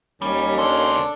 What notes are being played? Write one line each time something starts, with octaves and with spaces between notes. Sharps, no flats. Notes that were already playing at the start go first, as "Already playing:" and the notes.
D#2 G3 C#4
C#2 D4 A4 C5